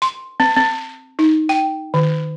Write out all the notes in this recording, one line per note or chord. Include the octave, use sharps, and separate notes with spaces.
C6
C4
C4
D#4
G5
D#3